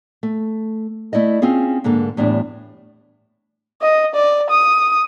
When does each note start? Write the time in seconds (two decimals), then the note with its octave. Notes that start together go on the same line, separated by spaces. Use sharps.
0.23 A3
1.13 A3 E4 D5 D#5
1.42 C4 C#4 F4 G#4
1.84 G#2 D3 A#3 A4
2.17 E2 A2 G3 D4
3.82 D#5
4.15 D5
4.50 D#6